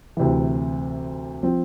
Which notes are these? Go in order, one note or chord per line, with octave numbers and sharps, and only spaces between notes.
D2 C3 E3
F3 C4 F4